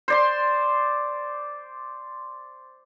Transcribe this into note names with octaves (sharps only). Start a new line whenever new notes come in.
C5 D5 C6